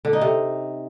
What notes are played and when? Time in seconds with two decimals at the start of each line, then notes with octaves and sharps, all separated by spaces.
0.05 D3
0.13 D#4
0.21 C3